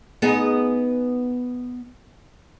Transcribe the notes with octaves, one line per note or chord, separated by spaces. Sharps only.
B3 D#4 G#4